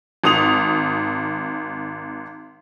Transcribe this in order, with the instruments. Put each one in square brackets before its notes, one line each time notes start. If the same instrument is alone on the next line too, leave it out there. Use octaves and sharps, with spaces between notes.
[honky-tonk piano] G#1 D#6 F7